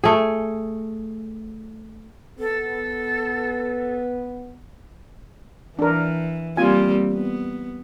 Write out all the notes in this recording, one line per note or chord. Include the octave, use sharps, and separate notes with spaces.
A3 G#4
B3 A4
E3 D4 A#4
G3 A#3 C4 F4 G#5
B3